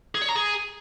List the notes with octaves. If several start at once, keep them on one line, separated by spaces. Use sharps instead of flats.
G#4
C#5
A#5
G#4